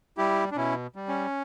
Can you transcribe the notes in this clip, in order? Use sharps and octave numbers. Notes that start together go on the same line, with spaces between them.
G3 E4 G4
D4
B2 C#4 E4
G3
C#4